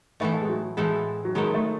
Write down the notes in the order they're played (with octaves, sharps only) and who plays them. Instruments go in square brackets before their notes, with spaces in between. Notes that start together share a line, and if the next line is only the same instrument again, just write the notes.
[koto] A2 E3 B3 E4 A4 [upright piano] A3
[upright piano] A3
G#3
F#3
[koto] A2 E3 B3 E4 A4 [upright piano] G#3
[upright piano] F#3
[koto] D#3 F#3 B3 E4 A4 [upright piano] G#3
[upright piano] A3